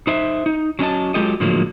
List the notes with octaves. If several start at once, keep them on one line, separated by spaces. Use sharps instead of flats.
D#4 C5 E5
D#4
F#3 C#4 D#5 A5
F#3 G#3 F4 G4 A4 D#5
A2 D3 F3 F#3 G#3 A#3